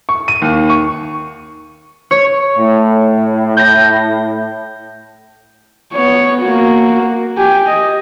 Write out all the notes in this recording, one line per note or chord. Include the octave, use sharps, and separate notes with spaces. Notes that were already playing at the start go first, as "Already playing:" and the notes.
C#6
D#7
D#2
C#6
C#5
A2
G6 A#6
B3 C#5
A#3 F#4
G4 G#5
D#5